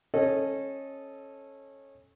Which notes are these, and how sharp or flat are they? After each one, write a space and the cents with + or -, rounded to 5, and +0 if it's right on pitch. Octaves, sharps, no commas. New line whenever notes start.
C#4 -20 A4 -15 D#5 +0